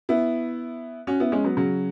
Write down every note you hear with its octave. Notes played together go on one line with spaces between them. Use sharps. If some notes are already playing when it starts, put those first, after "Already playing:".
B3 E4
C#4 F#4
B3 E4
G#3 C#4
F#3 B3
C#3 F#3